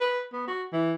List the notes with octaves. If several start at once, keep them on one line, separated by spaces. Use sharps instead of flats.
B4
B3
F#4
E3